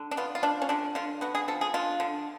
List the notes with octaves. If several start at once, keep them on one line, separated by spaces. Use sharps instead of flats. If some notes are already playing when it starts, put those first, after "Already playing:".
Already playing: D3
D4
B3 F4
F4
F3 D4
C#4
D3 D4
D3 F4
B3 F#4
G#4
F3 A4
G#4
D3 F4
D3